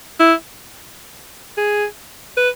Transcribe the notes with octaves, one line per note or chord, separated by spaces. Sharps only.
E4
G#4
B4